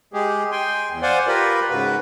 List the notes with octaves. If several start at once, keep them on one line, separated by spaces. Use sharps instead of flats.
G#3 G4 G#4
G5 G#5 C6
E2
C5 D5 F5 F#5 G#5 C6
F4 G4 A#4 B4 B5
G#2 C#3 F#4 B4